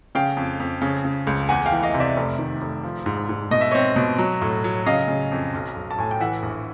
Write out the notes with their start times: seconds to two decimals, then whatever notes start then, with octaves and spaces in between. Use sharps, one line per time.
0.15 C#3 F5 G5
0.37 F2
0.60 F2
0.82 C#3
1.05 C#3
1.27 C#2
1.49 E2 F#5 G#5
1.66 F5 G5
1.71 E3
1.83 D#5 F5
1.94 C3
2.00 D5 E5
2.17 F1
2.39 D#3
2.62 F1
2.84 F3
3.06 G#2
3.29 G#2
3.51 B2 D#5
3.61 E5
3.71 C4 C#5 D#5
3.96 B2
4.18 F#3
4.41 A2
4.64 F#3
4.86 C#3 D#5 F5
5.08 C#3
5.32 F2
5.54 B1
5.76 B1
5.91 A5
5.98 A2 G#5
6.11 G5
6.20 E3 E5 F#5
6.43 A#1